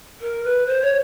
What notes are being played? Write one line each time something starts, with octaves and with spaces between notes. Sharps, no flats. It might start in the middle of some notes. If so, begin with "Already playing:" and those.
A#4
B4
C5
C#5